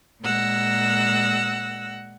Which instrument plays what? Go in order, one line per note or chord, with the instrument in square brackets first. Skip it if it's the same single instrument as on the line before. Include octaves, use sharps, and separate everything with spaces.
[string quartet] A#2 G#3 F#5 E6 A#6